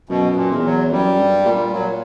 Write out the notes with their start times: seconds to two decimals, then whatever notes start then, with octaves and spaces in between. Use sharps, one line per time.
0.09 F#2 B2
0.36 A#2
0.51 E2
0.64 F#3
0.91 F#2 G3
1.19 G2
1.46 A#2
1.73 A#2 F#3